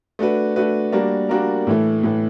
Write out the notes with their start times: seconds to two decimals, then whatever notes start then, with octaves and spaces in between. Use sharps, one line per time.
0.19 A3 D4 F#4 B4
0.56 A3 D4 F#4 B4
0.92 G3 A#3 D4 F#4 A#4
1.29 G3 A#3 D4 F#4 A#4
1.67 A2 E3 A3
2.03 A2 E3 A3